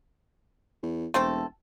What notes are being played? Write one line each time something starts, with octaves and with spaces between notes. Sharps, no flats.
E2
E1 A3 C4 A4